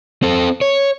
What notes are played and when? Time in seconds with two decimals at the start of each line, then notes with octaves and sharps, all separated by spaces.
0.23 C4 A4
0.61 C#5